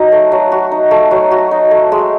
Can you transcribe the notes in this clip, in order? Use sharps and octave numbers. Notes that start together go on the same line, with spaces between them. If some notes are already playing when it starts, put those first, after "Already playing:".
Already playing: F#3 D#4 F#4
A3
F#3
F#4
D#4
A3
F#3
F#4
D#4
A3
G#3